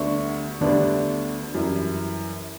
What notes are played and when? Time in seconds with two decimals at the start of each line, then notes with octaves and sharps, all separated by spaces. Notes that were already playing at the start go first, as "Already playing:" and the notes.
Already playing: D2 D3 G3 B3 D4 C#6
0.61 D2 D3 G3 B3 D4
1.54 F#2 E3 G3